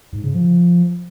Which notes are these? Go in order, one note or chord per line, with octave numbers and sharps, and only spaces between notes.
G#2
C#3
F3